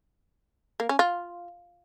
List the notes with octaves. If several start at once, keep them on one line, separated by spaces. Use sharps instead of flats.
A#3
C#4
F4